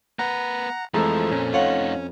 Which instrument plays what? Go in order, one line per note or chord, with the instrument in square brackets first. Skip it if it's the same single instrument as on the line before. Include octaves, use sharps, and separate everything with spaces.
[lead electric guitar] A#3 B4 [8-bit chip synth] F#5 A#5
[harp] F2 A4 A#5 [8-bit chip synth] E3 G#3 A3 [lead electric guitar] F3
[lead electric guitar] A#2 [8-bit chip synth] C#4
[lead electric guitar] A3 D#4 [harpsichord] F4 C#5 F#5